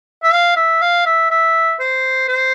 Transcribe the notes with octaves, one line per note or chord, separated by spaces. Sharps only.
E5
F5
E5
F5
E5
E5
C5
C5